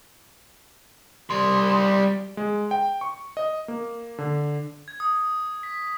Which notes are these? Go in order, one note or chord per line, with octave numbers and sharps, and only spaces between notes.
G3 C6
G#3
G5
C#6
D#5
A#3
D3
G#6
D#6
B6